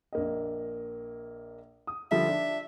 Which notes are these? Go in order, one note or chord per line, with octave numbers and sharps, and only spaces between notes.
A#1 A#3 D#5
D#6
D3 F3 G3 E5
D4